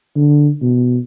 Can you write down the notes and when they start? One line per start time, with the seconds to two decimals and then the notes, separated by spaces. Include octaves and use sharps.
0.16 D3
0.62 B2